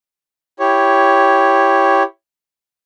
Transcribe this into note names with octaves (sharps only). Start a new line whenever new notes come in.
E4 G4 C#5